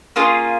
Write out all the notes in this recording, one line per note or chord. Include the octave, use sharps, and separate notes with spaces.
A#3 C#4 F4 G#4